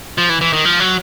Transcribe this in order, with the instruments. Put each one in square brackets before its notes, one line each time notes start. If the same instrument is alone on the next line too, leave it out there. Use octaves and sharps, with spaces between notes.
[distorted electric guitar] F3
E3
E3
D#3
F3
F#3